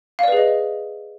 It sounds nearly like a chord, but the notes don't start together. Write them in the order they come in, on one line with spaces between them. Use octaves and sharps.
F5 D5 B4 G#4 D#5